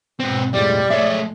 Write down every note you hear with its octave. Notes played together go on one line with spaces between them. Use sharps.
G#2 B2 C4 B4
F2 A2 G3 G#3 D5
A#1 G#3 A3 A4 C#5 E5